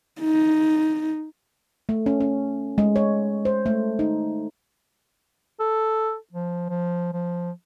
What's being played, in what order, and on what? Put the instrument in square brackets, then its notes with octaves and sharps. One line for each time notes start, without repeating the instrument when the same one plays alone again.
[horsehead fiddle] D#4
[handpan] A3
C#4
C#4
G#3
C#5
C5
A3
D#4
[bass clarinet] A4
F3
F3
F3